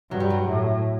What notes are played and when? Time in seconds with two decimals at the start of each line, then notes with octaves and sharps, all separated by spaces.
0.10 G2 F#3
0.20 G3
0.30 F#3
0.47 A2